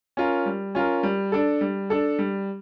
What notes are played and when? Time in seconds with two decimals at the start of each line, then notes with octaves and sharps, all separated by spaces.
0.17 C#4 F4 A#4
0.46 G3
0.75 C#4 F4 A#4
1.03 G3
1.32 D4 A4
1.61 G3
1.90 D4 A4
2.19 G3